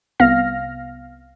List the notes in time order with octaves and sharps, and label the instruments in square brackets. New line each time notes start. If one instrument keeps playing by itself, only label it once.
[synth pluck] C2 B3 F5 F6 A#6